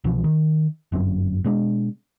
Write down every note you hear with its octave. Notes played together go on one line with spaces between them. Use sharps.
C2 B2 E3 F3
D#3
G1 F#2 C4
B2 G#3 D4